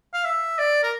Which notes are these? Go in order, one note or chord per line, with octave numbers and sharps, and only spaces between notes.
F5
E5
D5
A#4